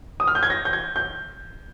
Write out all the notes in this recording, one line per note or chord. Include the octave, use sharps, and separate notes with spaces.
D#6
F6
G6
G#6
A#6
G6
G#6
G6